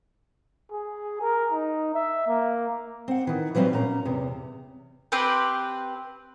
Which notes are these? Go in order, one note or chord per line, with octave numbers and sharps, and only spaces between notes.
G#4
A#4
D#4
E5
A#3
C4 F#5
D#3 E3
E3 F#3 G3 C4 E4 D#5
A#2 C#4 A#5
E2 C3
C4 G4 B4 C5